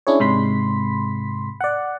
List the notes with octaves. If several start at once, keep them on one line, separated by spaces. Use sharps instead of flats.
C#4 D4 E4 G#4 C#5
G#2 C3 G#3 B5 C6 B6
D5 F#5